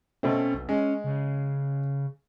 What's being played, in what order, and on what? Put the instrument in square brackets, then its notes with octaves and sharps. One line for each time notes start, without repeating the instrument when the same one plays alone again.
[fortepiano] B2 A3 C4 [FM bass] C#4
[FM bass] B1
[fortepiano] G#3 [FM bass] C#4
[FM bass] C#3